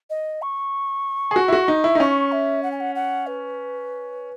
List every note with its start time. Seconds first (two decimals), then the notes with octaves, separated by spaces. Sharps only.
0.10 D#5
0.42 C#6
1.31 G#4
1.36 F#4
1.48 E4
1.53 F#4
1.68 D#4
1.84 E4
1.95 D#4
2.00 C#4 C#6
2.32 E5
2.63 F#5
2.71 G#5
2.80 F#5
2.95 F#5
3.27 B4